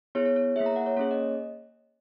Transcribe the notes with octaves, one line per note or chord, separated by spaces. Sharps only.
B3 E4 G#4 C#5
C#5
C#5
A#3 E4 G#4 E5
A#5
F#5
C#5
A#3 C#4 G#4 C#5
D#5